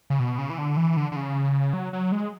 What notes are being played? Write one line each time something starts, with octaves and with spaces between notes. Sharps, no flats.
C#3
B2
C#3
E3
D3
E3
D3
D3
C#3
F#3
F#3
G#3